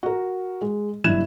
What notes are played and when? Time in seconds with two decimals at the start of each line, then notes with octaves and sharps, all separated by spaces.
0.03 F#4 A#4
0.61 G#3
1.04 F#1 G2 E4 F#6 G#6 E7